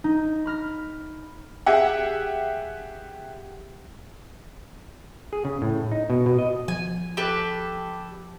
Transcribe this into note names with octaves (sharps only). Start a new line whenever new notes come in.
D#4
B5 F6 A#6
G4 G#4 E5 F#5
G#4
C#3
A2
D#4
B2
B2
D#5
F3 G#5
G4 A4 B4